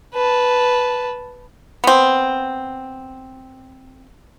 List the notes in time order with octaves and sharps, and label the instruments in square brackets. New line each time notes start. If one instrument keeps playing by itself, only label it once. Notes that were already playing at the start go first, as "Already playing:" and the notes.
[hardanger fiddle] B4 A5
[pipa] B3 C4